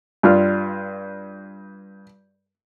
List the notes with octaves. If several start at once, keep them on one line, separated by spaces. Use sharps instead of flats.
G2 F4 F6